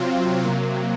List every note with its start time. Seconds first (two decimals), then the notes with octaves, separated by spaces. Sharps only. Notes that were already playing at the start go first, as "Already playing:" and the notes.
Already playing: C3 F#3 C4 F4
0.45 C3 F#3 A#3